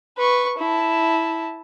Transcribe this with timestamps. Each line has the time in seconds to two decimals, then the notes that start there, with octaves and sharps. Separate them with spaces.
0.17 B4 C#6
0.58 E4 A5